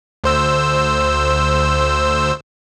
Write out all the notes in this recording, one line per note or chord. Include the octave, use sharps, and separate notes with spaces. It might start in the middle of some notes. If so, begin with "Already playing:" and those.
D2 C5 E6